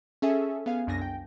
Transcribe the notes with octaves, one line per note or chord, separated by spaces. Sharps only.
C#4 G#4 A4 E5 G#5
B3 F5 G#5
C2 F#2 D4 G#5 A#6
G5